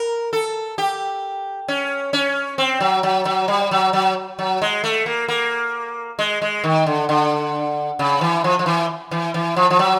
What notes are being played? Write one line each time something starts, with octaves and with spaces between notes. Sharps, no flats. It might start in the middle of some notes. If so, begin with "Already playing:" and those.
Already playing: A#4
A4
G4
C#4
C#4
C4
F#3
F#3
F#3
G3
F#3
F#3
F#3
G#3
A3
A#3
A#3
G#3
G#3
D#3
D3
D3
C#3
E3
F3
F3
E3
E3
E3
F3
F3
F#3